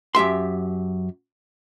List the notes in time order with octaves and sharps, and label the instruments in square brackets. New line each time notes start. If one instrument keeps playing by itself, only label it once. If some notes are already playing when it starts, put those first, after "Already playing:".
[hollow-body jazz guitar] F#2 G4 E5 C6